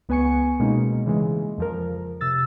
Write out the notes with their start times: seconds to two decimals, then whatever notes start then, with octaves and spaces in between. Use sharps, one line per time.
0.09 C#2 B3 B4 G#5 C#6 C#7
0.60 B2 G#3 A#3 C#4 D#4
1.06 C#3 E3 G#3
1.58 F2 F3 A#4
2.21 C3 E6 A6